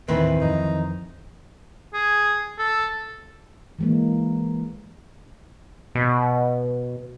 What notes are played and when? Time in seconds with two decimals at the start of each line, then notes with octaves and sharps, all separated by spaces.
0.08 D#2 A2 D#3 E3 C4 B4
0.41 F2 D#4
1.94 G#4
2.58 A4
3.79 E3 G#3 A#3
5.95 B2